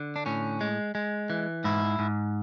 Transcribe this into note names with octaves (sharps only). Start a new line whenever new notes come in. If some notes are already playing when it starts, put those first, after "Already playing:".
Already playing: D3
D4
A2 C#4
G#3
G#3
E3
G#2 E4
G#2